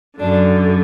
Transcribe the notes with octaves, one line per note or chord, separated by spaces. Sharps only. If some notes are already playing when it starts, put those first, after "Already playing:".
F#2 D3 D4